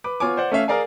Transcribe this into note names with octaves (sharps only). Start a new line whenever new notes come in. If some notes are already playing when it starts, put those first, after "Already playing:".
B4 D6
B3 F4 C#5 G#5 D6
C5 D5 F#5
A3 C#4 E5 F5
G#4 A#4 D5 F5 G#5